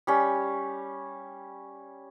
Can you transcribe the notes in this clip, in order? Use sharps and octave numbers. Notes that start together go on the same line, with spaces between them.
G3 C#4